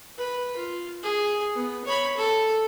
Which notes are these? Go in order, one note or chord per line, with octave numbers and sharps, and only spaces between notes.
B4
F4
G#4
B3
C#5 B5
A4